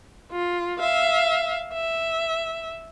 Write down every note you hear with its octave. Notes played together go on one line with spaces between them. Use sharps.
F4
E5 F5
E5